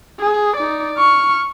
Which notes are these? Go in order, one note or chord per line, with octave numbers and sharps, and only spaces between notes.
G#4
D#4 D5
C#6 F6